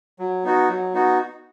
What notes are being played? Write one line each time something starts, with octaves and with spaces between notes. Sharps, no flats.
F#3
B3 D#4 F#4
F#3
B3 D#4 F#4